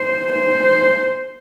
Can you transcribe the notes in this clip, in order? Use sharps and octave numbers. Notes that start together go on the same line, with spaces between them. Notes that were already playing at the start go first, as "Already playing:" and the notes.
Already playing: C5
C5